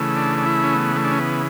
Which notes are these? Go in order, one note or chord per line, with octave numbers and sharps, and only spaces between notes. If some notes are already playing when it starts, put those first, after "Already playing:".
Already playing: C#3 E3 A3
D4
D4
E4
C#4
B3
A3
D4
C#4
B3